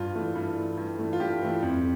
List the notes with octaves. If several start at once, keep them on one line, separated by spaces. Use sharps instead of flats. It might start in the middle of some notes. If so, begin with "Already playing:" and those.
Already playing: G2 F4
E3 A3
G2
E3 A3
G2
E3 A3
F4
G2 G4
E3 A3
F2